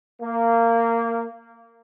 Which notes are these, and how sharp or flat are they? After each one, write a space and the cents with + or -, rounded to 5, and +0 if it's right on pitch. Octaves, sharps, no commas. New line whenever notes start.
A#3 -15